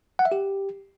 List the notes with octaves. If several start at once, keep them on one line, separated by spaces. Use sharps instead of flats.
F#5
E5
G4